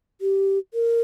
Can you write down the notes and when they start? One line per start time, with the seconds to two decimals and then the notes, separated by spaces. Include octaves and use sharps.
0.21 G4
0.74 A#4